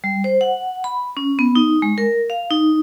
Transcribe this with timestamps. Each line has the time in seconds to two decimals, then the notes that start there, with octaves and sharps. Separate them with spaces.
0.04 G3
0.24 C5
0.41 F#5
0.84 B5
1.17 C#4
1.39 B3
1.55 D#4
1.82 G#3
1.98 A#4
2.30 F5
2.51 D#4